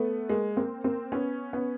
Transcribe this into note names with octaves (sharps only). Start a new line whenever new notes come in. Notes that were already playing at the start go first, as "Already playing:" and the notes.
Already playing: A3 B3
G#3 A#3
A#3 C4
A#3 C4
B3 C#4
B3 C#4